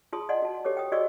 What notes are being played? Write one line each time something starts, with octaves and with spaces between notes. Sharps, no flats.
F4 G#4 A5 C6 D#6
D5 D#5 F#5 G#5 C6
F#4 A5
G4 A4 C#5 D6
G5 D#6
F#4 G#4 D5 D#5 C#6 E6